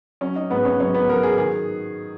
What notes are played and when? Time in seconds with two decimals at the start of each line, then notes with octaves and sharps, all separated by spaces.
0.21 F#3 C#4 C#5
0.36 D#4 D#5
0.50 G#2 B3 B4
0.65 C#4 C#5
0.80 F#3 C#4 C#5
0.94 B3 B4
1.09 F#3 A#4
1.23 G#4
1.38 D#3 G#4